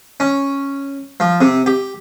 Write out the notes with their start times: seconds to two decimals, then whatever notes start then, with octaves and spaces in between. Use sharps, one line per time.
0.20 C#4
1.20 F3
1.41 C3
1.66 G4